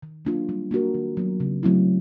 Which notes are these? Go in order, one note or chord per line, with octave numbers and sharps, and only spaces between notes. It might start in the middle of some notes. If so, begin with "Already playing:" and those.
D#3
F#3 A#3 D4 F4
G3
A#3 D4 F#4 A#4
D#3
F#3 B3
C#3
F#3 A3 C4 E4